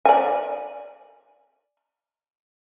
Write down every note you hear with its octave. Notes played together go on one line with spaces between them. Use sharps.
D5 G#5